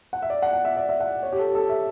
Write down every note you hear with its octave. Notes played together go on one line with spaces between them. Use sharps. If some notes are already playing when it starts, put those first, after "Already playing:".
F#5
E5
D5
F#5
F#5
E5
D5
E5
F#5
C#5
G4
A4
A4
E5